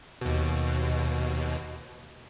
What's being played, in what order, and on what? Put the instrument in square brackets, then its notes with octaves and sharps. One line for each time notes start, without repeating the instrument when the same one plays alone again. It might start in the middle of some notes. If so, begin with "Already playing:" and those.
[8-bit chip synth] D#2 B2